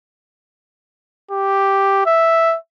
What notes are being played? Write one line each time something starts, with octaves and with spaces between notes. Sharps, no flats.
G4
E5